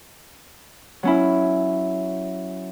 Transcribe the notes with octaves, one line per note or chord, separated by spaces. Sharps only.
F#3 C#4 E4